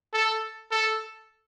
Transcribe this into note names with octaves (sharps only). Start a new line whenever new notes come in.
A4
A4